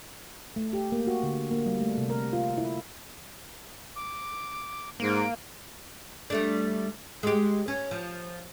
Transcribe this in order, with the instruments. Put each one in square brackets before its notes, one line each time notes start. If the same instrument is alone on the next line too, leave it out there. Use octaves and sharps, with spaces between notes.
[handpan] A3
G4
A#3
F#4
D3
A#3
G3
A3
C3
A#4
F4
E4
[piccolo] D6
[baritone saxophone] G#2 [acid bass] A#3 [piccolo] D7
[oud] G3 A3 D4
G#3 G4
C#4
F3